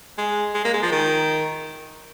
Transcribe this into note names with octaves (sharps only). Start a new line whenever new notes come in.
G#3
G#3
A#3
G#3
F3
D#3